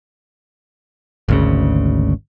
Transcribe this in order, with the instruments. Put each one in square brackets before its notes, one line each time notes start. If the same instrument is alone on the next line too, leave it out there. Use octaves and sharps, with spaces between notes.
[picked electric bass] G#1 D2 C#3